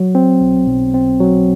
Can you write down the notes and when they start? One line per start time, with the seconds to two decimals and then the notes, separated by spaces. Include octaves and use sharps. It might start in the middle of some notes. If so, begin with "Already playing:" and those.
Already playing: F#3
0.15 C4
0.41 B1
0.67 B1
0.94 C4
1.20 F#3